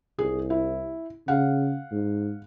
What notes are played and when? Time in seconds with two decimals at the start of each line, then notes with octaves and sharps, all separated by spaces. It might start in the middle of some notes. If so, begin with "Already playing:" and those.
0.19 C2 G#4
0.50 E4
1.28 C#3 F5 F#5
1.91 G#2